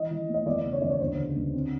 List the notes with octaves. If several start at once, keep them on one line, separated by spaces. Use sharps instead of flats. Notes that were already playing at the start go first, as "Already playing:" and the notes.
Already playing: E3 D#5
E3
A3
D#5
E2 D5
C#3
C#5
E2 D5
C#5
D2 C5
C#3
D2
C4